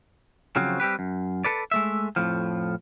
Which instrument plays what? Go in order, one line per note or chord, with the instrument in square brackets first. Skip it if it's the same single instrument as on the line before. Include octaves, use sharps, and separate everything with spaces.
[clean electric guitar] C#3 F3 F#3 C4
G3 C4 G4 B4
F#2
A4 B4 D5
G#3 A3 E5
F2 A2 F3